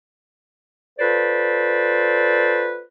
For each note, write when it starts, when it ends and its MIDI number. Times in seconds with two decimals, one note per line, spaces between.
0.99 2.82 65
0.99 2.82 69
0.99 2.82 71
0.99 2.82 72
0.99 2.82 74